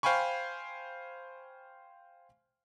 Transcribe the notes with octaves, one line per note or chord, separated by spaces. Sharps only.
C5 F5 G5 G#5 B5 C#6